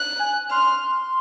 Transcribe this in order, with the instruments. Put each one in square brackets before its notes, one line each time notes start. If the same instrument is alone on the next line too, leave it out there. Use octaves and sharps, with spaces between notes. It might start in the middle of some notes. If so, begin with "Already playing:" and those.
Already playing: [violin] F#6
[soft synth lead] G#5
[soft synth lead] C6 [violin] F6